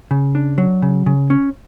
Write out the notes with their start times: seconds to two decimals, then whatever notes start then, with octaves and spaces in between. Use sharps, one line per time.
0.11 C#3
0.35 D4
0.58 F#3
0.82 C#3
1.06 C#3
1.30 C#4